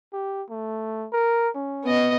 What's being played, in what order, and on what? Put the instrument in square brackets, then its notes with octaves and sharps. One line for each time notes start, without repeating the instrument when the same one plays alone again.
[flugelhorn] G4
A3
A#4
C#4
[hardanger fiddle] B3 D#5